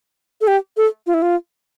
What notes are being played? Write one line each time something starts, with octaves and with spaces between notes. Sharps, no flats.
A4
G4
A4
F4
E4
F4